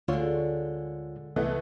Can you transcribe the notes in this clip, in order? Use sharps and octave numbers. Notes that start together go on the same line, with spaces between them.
D2 D3 G#3 F4 C#5
C2 E3 A3 B3